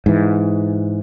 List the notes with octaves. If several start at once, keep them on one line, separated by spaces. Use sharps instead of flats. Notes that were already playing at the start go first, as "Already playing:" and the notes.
G#2 E3